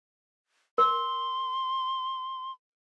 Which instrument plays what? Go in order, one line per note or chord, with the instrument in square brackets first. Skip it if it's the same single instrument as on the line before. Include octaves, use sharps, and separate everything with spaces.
[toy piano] A#4 [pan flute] C6